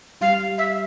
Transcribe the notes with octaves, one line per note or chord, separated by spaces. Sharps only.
G3 F5
E5